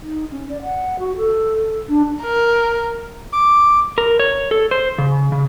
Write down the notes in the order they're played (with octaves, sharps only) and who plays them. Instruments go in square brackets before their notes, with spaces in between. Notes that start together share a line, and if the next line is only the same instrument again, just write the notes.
[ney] D#4
C#4
D5
F#5
F#4
A4
D4
[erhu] A#4
[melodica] D6
[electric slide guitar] A#4
C#5
A4
C5
C#3
C#3